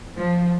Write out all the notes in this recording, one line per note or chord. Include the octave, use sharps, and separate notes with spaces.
F3